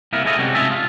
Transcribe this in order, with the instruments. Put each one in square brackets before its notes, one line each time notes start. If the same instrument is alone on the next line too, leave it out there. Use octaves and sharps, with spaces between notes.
[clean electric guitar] C2 A#3 B3 E4 A#4
G#3 E4 A4 C#5 D#5
C3 G3 G#3 C#4 F#4
G#2 C3 F4 G#4 E5 A5
F4